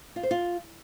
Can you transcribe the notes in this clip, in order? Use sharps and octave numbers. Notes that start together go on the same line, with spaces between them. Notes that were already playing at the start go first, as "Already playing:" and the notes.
F4
C5
F4